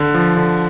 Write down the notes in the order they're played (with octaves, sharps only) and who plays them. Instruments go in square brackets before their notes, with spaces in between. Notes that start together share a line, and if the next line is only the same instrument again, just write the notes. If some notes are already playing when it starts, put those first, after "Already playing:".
Already playing: [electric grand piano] D3
F3
D3